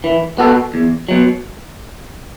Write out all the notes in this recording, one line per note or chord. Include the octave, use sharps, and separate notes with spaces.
E3
B3 F#4 A4
E2
B2 F#3